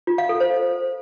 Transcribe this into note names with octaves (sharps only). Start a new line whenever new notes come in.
F4
F5
A4
C5